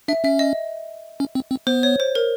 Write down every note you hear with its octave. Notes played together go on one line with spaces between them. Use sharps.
D4 E5
C#4 E5
D#5
C#4
C4
C4
B3 C5
C#5
C5
A#4